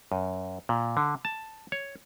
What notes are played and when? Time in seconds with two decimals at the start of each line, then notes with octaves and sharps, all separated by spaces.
0.12 F#2
0.69 A#2
0.97 D3
1.25 A5
1.72 C#5